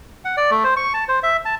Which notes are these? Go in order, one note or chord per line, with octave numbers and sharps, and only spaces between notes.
F#5
D5
A3
C5
C#6
A5
C5
E5
A5